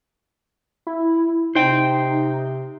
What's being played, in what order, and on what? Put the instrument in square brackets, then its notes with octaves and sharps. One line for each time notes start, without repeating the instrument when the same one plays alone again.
[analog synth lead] E4
[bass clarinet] C3 [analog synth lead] D#4 [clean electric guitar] C5 G5